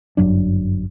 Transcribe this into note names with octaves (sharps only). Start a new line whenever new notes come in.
G1 F#2 F#3 D4